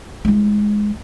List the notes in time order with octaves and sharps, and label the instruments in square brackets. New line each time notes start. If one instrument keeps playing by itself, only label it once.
[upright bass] G#3 E4